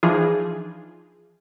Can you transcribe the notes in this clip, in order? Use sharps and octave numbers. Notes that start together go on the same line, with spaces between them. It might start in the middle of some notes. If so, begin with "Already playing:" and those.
E3 F3 D4 D#4 F4 G#4